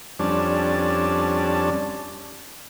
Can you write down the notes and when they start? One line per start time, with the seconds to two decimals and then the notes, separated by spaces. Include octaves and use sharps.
0.19 F2 G3 C#4 D4 A5